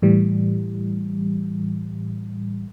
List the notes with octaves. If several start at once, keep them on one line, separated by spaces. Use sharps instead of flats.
A2 E3 G3